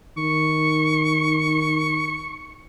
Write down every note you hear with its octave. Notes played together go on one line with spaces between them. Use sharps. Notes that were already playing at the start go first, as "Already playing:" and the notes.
D#3 C#6